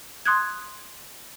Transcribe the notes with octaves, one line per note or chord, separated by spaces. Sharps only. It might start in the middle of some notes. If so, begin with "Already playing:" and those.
C6 D#6 F#6 G#6